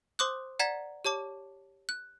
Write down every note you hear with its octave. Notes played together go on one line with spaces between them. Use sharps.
C5 C6 D6 D#6 F#6
D5 F#5 A#5 G#6 B6
G4 C#5 A5 D6
F#6